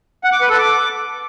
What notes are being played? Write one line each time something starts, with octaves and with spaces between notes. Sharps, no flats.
F#5
D6
B4
A4
D6